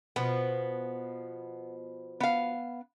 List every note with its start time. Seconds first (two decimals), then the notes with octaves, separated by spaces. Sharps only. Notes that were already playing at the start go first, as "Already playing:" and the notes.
0.16 B2 F3 B3
2.20 B3 F5